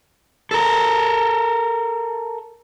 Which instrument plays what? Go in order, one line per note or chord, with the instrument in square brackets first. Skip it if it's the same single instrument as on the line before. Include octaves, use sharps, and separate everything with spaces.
[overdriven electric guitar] A4 A#4